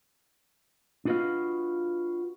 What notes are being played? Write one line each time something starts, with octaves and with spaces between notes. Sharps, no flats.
D4 F4 F#4 B4 D#5 F5